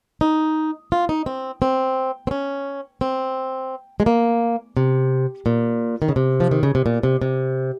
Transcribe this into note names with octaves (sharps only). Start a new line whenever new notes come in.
D#4
F4
D#4
C4
C4
C4
C#4
C4
G#3
A#3
C3
A#2
D#3
C#3
C3
F3
D#3
C#3
C3
A#2
C3
C3